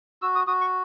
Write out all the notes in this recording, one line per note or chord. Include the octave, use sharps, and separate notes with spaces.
F#4 E6
D#6
F#4 D#6
C#6